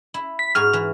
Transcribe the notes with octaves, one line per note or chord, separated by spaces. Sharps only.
E4
B6
G#2 F#4 G#5 F6
E3